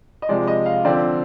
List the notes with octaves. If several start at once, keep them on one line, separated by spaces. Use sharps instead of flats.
D#5
C3 F3 G#3 D5
D#5
F5
D3 F3 C4 D5